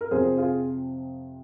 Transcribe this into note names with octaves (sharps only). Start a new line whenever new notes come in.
A#4
F2 C3 F3 G#4 C5
F4 G#4